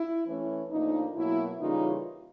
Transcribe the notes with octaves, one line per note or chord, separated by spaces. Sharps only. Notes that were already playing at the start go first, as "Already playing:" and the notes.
Already playing: E4
E3 A3 C#4
A2 F3 A#3 D4 D#4
B2 F#3 A#3 E4
C#3 E3 G3 A#3 C#4 D#4 F4